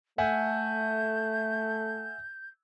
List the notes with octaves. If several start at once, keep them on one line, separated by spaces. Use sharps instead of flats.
A3 E5 F#5 G#5 G6